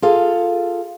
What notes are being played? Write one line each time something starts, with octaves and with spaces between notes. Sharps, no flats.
F4 G#4 A4 F5